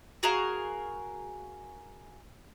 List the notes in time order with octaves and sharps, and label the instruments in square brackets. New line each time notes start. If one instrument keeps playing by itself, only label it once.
[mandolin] F#4 G#4 A#4 F5